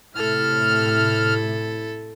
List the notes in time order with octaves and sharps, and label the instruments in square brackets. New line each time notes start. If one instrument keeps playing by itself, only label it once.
[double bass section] A2 C3 [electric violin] E4 A4 [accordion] F6